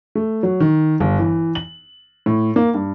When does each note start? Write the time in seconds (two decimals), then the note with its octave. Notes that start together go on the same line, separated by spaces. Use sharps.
0.15 A3
0.43 F#3
0.60 D#3
1.00 G1
1.19 E3
1.55 F#7
2.26 A2
2.56 A#3
2.74 G2